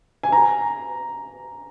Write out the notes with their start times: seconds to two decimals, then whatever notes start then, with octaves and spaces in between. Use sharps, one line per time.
0.23 G#5
0.32 A#5